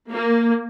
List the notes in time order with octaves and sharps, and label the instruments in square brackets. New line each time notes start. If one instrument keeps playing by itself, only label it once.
[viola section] A#3